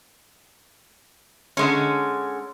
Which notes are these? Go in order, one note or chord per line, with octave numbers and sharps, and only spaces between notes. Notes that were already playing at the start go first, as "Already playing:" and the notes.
D3 G#3 C#4